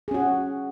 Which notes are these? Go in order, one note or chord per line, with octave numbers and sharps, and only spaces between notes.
C#4 F#4 G#4